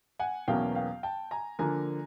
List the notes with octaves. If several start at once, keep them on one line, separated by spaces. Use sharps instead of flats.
F#5 G#5
E2 B2 F#3 A#3 C#4 F5 G5
F5 G5
G5 A5
G#5 A#5
D3 F3 A#3 G#5 A#5